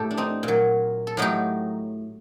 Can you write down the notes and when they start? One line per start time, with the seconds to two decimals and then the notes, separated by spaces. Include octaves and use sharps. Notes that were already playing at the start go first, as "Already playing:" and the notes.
Already playing: A2 G4 A4
0.11 D4
0.17 C4 D#4
0.43 A#2
0.48 F#3
1.07 A4
1.17 A2 F#3 D#4 G4